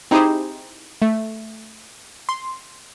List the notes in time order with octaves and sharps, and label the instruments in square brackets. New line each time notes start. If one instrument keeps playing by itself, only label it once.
[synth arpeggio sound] C4 D#4 E4 G4 G#4 C5
A3
C6